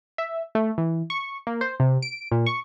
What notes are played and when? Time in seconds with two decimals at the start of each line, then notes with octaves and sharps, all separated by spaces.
0.18 E5
0.55 A3
0.78 E3
1.10 C#6
1.47 A#3
1.61 C5
1.80 C3
2.03 D7
2.31 A#2
2.46 C#6